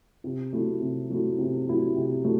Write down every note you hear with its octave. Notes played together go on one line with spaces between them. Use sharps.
C3
F#3 A3 E4
C3
F#3 A3 E4
C3
F#3 A3 E4
C3
F#3 A3 E4